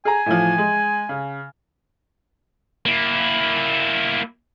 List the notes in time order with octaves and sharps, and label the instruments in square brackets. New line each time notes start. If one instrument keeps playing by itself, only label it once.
[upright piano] G#4 A#5 [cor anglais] G#5
[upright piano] A2 E3 F3
G#3
C#3
[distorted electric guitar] A#3 E4